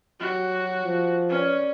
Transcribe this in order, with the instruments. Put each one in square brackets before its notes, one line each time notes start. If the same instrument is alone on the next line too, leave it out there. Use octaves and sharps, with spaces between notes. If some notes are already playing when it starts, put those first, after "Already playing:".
[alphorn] F#3 [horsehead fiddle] F#4 [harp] G4 A#6
[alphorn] F3
[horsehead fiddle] C#4 [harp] B4 C#5 D5